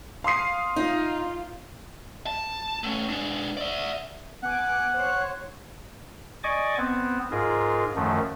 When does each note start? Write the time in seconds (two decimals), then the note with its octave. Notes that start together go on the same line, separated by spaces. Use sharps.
0.24 F5 C6 D#6 C7
0.76 D#4 F4
2.26 A5
2.84 A3 C#4
3.09 G#3 D4
3.57 D5 E5
4.43 B3 F#5 G#5 D6
4.94 C5 C#5
6.44 D5 D#5 G#5 C#6 D6
6.78 B3 C4
7.31 G#2 F4 G#4 A#4
7.95 F#2 D#3 F3 A3